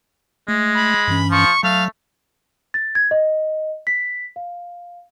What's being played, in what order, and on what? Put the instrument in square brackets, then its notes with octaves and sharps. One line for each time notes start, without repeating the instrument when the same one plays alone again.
[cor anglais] G#3 [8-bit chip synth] A3
[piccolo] B5
[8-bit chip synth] G2 E3 C#4
[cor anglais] F3 [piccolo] C#6
[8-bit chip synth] F#3 [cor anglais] A3 [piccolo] F5
[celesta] A6
G#6
D#5
B6
F5